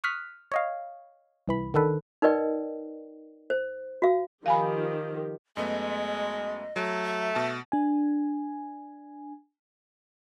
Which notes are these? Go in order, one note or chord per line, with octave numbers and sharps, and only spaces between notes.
C#6 D#6 F6 F#6 B6
C#5 D#5 F5
C2 E3 B5
D3 D#3 A4 B4
D#4 A#4 B4 D5 D#5 G5
C5
F#4 F5
D#3 F3 G4 F5 G#5 B5
F#2 G#3 A3 B3 D#5
F#3 A3
E5
B2 A5
D4 G#5